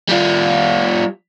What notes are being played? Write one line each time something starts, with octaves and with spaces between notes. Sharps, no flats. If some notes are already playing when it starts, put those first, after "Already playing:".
G3 F4